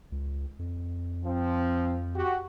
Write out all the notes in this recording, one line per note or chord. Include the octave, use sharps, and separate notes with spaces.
C#2
F2
F3 C4
F#4 G4